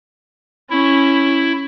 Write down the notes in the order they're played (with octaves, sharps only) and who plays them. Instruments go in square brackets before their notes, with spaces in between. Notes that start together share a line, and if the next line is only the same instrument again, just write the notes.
[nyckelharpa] C#4 [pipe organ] E4